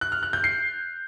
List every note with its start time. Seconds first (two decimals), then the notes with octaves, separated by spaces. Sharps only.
0.01 F#6
0.12 F6
0.23 F#6
0.33 G6
0.44 C7